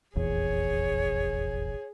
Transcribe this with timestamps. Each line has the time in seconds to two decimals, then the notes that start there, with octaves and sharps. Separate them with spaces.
0.15 F1 A#1 E2 G#4 C#5